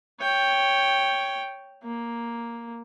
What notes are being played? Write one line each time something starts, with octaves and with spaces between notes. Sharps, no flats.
C#5 G5
A#3